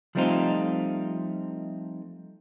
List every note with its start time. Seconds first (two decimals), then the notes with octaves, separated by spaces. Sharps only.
0.15 F3 G3 A3 C4 D#4 F4